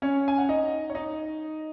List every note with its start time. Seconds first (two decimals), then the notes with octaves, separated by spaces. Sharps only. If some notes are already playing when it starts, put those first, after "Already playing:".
0.02 C#4 C#5
0.28 G#5
0.38 F#5
0.49 D#4 D#5
0.90 C#5
0.95 D#4 D#5